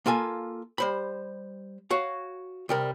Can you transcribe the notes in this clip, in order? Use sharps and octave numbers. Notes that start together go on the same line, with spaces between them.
A#3 F4 A4 G#5
G3 C5 B5
F#4 C#5 F5
C2 G3 A#4